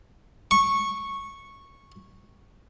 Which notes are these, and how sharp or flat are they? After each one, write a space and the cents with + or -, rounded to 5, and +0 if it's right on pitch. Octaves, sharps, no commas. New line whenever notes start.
C#6 -10